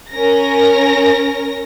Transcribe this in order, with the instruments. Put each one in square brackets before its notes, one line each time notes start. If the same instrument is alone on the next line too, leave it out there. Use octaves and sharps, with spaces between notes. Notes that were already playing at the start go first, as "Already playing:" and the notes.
[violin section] C#4 A#4 A#6